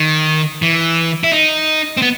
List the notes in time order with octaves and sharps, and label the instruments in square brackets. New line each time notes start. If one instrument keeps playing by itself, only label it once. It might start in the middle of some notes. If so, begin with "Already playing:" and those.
Already playing: [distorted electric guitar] D#3
E3
E4
D#4
C4
B3